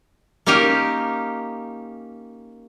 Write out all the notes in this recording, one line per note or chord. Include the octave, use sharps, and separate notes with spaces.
A#3 C#4 D#4 G4 A#4